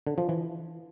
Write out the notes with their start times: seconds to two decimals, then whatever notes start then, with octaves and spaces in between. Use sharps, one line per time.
0.07 D3
0.18 F3
0.29 E3